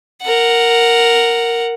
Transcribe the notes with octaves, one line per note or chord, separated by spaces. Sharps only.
A#4 F#5